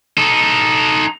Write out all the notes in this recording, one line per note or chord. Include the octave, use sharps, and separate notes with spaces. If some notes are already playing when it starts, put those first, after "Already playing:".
D#4 A4